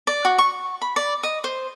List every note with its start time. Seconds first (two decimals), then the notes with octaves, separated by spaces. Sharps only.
0.07 D5
0.25 F#4
0.38 C#6
0.82 B5
0.96 D5
1.23 D#5
1.44 C5